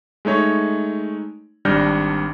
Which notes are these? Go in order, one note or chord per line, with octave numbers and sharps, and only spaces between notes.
G#3 A3 D#4 C#5
G#1 G3 D4 F6 G6 A#6